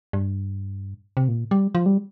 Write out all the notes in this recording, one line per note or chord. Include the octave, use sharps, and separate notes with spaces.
G2
C3
A#2
G3
F3
G3